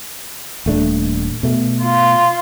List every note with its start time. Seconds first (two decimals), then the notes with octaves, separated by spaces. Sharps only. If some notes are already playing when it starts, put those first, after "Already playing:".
0.66 D#1 A3 D4
1.43 B2 A3
1.82 F4